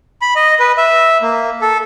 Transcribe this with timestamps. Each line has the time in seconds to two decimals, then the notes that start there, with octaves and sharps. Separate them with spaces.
0.21 B5
0.36 D#5
0.60 B4
0.77 E5
1.22 A#3
1.62 A4